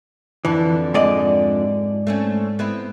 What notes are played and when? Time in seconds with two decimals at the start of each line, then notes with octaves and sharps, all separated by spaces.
0.45 F2 D3 E3 F3
0.94 G#2 D5 D#5
2.07 A3 C4 C#4
2.59 B3 C4 E4